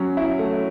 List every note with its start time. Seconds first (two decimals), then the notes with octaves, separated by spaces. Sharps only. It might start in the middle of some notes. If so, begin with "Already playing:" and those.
Already playing: F#3 C#4
0.17 E4
0.39 A3